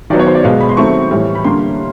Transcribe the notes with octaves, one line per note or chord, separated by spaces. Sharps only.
D#3 F#3 B3 D5
C#5
C5
D5
B2 G#3 B3 F5
B5
C6
D#3 F#3 A3 C4 C#6
A2 E3 G3
B5
D3 G3 A#3 C6